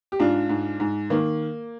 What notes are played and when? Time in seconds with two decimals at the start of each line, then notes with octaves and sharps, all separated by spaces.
0.12 G4
0.19 G#2 D4 F4
0.49 G#2
0.80 G#2
1.10 D#3 A#3